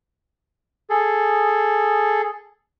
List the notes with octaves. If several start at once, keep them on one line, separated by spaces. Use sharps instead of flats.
G#4 A4